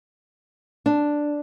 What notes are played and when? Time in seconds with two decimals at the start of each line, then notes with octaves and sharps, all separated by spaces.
0.86 D4